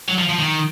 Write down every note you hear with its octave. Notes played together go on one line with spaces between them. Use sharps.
F#3
F3
F3
D#3